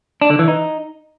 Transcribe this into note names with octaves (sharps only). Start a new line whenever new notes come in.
D4
D3
E3
D#4